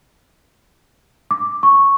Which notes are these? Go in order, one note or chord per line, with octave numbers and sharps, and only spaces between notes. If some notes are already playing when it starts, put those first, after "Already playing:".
D6
C#6